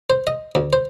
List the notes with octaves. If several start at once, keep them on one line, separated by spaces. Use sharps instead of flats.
C5
D#5
D2
C5